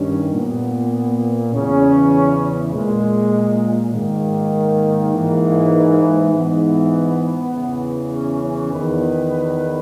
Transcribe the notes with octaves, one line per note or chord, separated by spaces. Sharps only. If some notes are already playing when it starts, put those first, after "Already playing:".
Already playing: G2 D#3 C#4
A#2 B3
E2 C#3 E3 C#4
A#2 G#3
G#2 D#3 A#3
G#2 E3
G#2 E3 B3
E2 C#3 E3
C#4
C#4
E2 D#3 B4